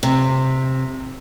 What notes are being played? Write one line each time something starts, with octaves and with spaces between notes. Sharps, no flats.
C3